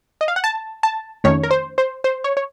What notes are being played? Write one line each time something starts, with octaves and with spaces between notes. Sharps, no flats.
D#5
F5
F#5
A5
A5
F2 D#3 A3 C#4 C#5
A#4
C5
C5
C5
C#5
C#5